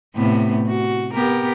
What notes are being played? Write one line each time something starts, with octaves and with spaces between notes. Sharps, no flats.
A2 C3 B3
F#4
B3 G4 A#4